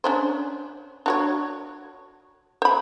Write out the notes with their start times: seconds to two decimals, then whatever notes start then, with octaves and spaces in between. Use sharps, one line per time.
0.04 C#4 D4 C5
1.06 D4 F#4 C#5
2.62 C5 B5